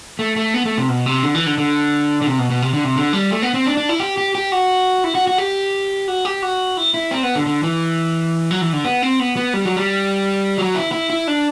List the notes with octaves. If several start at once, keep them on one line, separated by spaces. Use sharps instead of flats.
A3
A3
B3
A3
C3
B2
C3
D3
E3
D3
D3
D3
C3
B2
B2
C3
D3
C3
D3
G3
A3
B3
C4
D4
D4
E4
G4
G4
G4
F#4
E4
F#4
F#4
G4
F#4
G4
F#4
E4
E4
C4
B3
D3
D3
E3
F#3
E3
D3
B3
C4
B3
B3
G3
F#3
G3
F#3
E4
E4
E4
D4